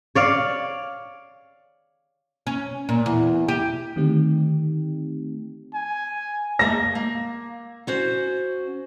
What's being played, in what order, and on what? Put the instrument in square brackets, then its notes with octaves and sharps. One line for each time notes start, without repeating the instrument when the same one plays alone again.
[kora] C#5 D5 F5
[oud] C#4
A#2
E2
G4
[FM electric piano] D3 D#3 A3 C4 D#4 G4
[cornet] G#5
[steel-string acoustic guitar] A#3 D#5 A5 [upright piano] A#6
[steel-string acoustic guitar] A#3
C#4 F#4 C5